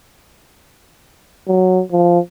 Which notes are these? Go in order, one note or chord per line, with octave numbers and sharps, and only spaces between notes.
F#3
F3